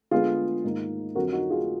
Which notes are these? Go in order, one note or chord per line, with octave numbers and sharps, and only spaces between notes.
D3 G#3 B3 F4 G#4
G#2 D#3 A#3
F2 D3 F#3 F#4 A#4
D#4 F#4
F4 G#4